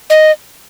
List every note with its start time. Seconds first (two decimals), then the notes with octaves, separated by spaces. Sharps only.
0.10 D#5